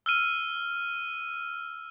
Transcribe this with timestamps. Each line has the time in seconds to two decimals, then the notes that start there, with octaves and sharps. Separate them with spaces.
0.06 E6 F6 D#7